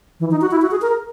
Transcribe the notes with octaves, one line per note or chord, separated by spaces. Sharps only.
E3
D#4
F#4
E4
F#4
G#4
A#4